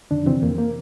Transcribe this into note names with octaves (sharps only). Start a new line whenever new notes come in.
F2 D3 D4
C3 E3 C4
F2 A#3
A#3